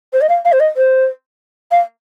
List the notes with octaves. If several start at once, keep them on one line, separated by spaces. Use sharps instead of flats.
C5
D#5
F5
F5
C5
D#5
C5
F5